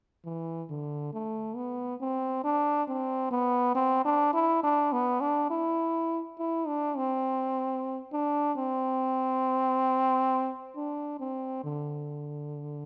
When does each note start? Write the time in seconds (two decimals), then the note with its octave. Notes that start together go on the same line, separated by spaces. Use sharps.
0.25 E3
0.70 D3
1.13 A3
1.56 B3
2.01 C4
2.44 D4
2.88 C4
3.31 B3
3.75 C4
4.05 D4
4.34 E4
4.63 D4
4.93 B3
5.21 D4
5.51 E4
6.39 E4
6.67 D4
6.97 C4
8.13 D4
8.57 C4
10.76 D4
11.20 C4
11.64 D3